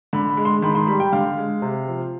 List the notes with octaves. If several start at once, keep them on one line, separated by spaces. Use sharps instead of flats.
D3 B5
B5
G#3
C6
D#3 B5
C6
G3 B5
G5
D3 F5
G#3
C3
F3